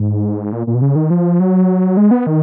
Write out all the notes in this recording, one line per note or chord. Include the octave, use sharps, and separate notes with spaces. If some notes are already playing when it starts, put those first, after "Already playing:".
Already playing: G#2
A#2
A#2
B2
C#3
D#3
F3
F#3
G#3
B3
D#3